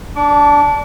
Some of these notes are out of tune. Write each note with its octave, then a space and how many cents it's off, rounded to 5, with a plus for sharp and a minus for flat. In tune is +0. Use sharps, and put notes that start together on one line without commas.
D4 -10 D6 -40